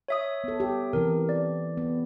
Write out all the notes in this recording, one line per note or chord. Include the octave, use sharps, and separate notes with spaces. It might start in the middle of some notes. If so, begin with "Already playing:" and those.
C#5 E5 D#6
B3 A4
G4
C3 E3 A#4
D5
B3